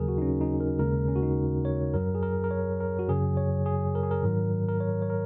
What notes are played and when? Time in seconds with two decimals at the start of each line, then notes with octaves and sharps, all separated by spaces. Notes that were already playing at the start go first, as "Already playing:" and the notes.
Already playing: D#2 C#3 F#3 G#4 A#4
0.08 F#4
0.18 D#4
0.22 C#4
0.41 D#4
0.60 A#4
0.79 D#2 C#3 G#3 A#4
1.08 C#4
1.16 F#4
1.23 D#4
1.65 C#5
1.94 F#2 F#3 A#4
2.15 G#4
2.23 A#4
2.44 A#4
2.51 C#5
2.81 A#4
2.99 F#4
3.08 F#2 C#3 F#3 G#4
3.37 C#5
3.66 G#4
3.95 A#4
4.03 G#4
4.11 A#4
4.23 G#2 D#3 F#3
4.69 A#4
4.80 C#5
5.02 C#5
5.10 A#4